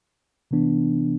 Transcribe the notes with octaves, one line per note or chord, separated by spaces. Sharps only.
C3 E3 B3 D4